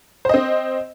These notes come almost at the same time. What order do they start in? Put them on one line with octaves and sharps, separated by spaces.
C5 D#5 C4